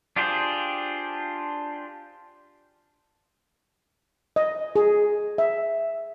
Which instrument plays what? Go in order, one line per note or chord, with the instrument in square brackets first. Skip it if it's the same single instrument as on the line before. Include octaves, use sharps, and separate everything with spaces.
[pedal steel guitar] D4 F4 G4 G#4 C5
[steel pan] D#5
G#4
E5